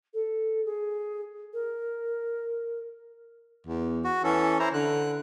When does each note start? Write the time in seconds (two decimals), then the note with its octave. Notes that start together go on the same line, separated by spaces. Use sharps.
0.14 A4
0.66 G#4
1.53 A#4
3.67 E2
4.04 F#4
4.24 E3 C#4 A4
4.59 E4 C5 A#5
4.74 D3 F#6